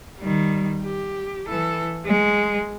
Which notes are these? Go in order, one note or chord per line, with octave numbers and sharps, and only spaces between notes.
D#3 G3
G4
E3 A4
G#3